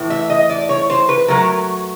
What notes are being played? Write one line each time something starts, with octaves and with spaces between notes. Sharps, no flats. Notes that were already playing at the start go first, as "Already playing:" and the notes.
Already playing: A2 E3 A3
E5
D#5
D5
C#5
C5
B4
F#3 A3 A#4